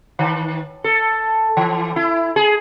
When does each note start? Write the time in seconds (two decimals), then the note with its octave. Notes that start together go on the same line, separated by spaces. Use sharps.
0.19 D#3
0.84 A4
1.57 E3
1.96 E4
2.36 G#4